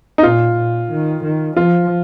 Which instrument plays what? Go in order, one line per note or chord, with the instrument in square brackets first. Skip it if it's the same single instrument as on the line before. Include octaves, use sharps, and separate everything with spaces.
[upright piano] D#4
[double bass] A#2 [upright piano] F4
[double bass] A#2
D#3
D#3
[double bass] F3 [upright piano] F4